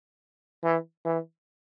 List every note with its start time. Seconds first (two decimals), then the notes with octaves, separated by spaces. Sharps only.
0.64 E3
1.05 E3